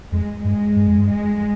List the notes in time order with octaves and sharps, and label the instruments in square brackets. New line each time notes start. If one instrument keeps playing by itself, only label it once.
[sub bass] F2 [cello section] G#3
[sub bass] G2 [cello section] G#3
[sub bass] G2
F2
G2
[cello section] G#3